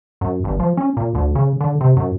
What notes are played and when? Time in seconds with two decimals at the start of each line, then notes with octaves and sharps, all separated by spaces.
0.21 F#2
0.44 G1
0.60 F3
0.77 C#4
0.97 A#2
1.15 D2
1.35 C#3
1.61 D3
1.81 C3
1.97 F#2